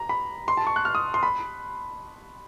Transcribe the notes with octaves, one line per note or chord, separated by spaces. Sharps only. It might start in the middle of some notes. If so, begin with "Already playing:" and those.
Already playing: A#5
B5
C6
A5
C#6
F#6
F6
D#6
C6
B5